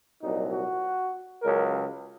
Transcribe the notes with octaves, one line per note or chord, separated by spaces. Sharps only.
C2 A#2 F#3 D#4
F#4
C#2 C#3 F#3 A#4